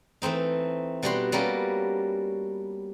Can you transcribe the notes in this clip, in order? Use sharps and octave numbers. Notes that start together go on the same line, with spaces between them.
E3 A3 C4 D#4
B2 G3 D4 F#4 C#5 C6
G3 A#3 B3 C#4 F#4 A4